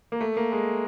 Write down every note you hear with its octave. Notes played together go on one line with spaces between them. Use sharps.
A#3
A3
A#3
G#3